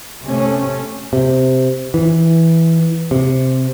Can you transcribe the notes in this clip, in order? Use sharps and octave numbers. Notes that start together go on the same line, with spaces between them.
C3 A3 C#4
C3
E3
C3